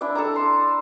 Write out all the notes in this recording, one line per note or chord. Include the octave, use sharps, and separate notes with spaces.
D4 E4 D5
A4 A5 A#5
C6